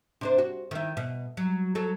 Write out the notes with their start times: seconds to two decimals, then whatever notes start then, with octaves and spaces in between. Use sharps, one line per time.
0.21 C3 D4 C5
0.38 F#4
0.71 D#3 E4
0.97 B2
1.37 F#3
1.75 F#3 A4